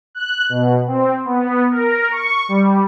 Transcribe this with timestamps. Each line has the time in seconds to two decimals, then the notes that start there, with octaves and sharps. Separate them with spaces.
0.15 F#6
0.49 B2
0.87 C4
1.25 B3
1.70 A#4
2.11 C#6
2.49 G3